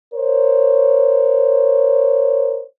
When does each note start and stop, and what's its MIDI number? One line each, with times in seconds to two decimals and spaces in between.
0.15 2.63 70
0.15 2.63 72
0.15 2.63 73